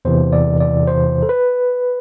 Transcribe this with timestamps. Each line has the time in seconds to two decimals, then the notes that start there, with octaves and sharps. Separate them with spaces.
0.05 E2 C3 E3 C5
0.33 D5
0.60 D5
0.87 C5
1.22 A4
1.29 B4